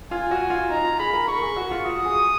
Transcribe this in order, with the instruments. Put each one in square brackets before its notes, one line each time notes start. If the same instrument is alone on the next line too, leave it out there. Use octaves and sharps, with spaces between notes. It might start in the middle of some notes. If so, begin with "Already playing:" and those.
[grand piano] F4 [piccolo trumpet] G#5
[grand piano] F#4
F4
[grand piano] D#4 [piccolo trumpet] A#5
[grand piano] F4
[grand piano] G#4 [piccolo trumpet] B5
[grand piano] A#4
[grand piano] A#4 [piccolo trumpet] C#6
[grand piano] G#4
F#4
F4
[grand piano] F#4 [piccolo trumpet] D#6
[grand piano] G#4